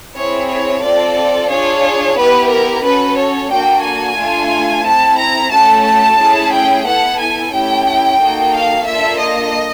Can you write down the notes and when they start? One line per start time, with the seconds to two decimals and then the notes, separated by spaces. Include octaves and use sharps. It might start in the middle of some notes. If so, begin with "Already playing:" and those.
0.15 C4 E4 G#4 C#5
0.49 C#5
0.83 C4 F4 A4 D5
1.50 D4 F4 G#4 C#5
2.17 B3 E4 G4 B4
2.51 A#4
2.84 C#4 F#4 A4 B4
3.18 C#5
3.50 A#3 D4 F#4 A4 G5
3.84 G#5
4.17 A3 D4 F4 A4
4.85 C4 E4 A4 A5
5.19 A#5
5.52 A3 C#4 F#4 A4 A5
5.85 A5
6.19 A3 C#4 E4 G#4
6.53 G5
6.86 B3 E4 A4 F#5
7.19 G#5
7.53 A3 C#4 E4 G4 G5
8.20 A#3 D#4 F#4 A4
8.53 F5
8.87 A#3 D4 F4 A4 E5
9.21 D#5